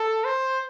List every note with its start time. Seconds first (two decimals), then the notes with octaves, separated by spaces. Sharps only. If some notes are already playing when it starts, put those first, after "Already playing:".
Already playing: A4
0.25 C5